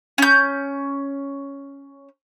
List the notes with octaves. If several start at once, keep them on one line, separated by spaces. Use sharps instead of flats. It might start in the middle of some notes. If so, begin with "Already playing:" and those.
C#4 G6